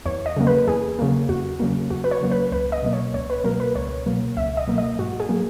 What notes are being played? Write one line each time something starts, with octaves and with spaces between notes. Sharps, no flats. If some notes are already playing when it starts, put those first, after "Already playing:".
E2 C#5
D#5
C#3 F#3 A#3
B4
E2 G#4
C#3 F#3 A#3
E2 F#4
C#3 F#3 A#3
E2 F#4
B4
C#5
C#3 F#3 A#3
B4
C#2 B4
D#5
B2 F#3 A#3
C#5
C#2 C#5
B4
B2 F#3 A#3 A#4
B4
C#2 C#5
B2 F#3 A#3
C#2 E5
D#5
B2 F#3 A#3
D#5
G#2 F#4
G#4
F#3 A#3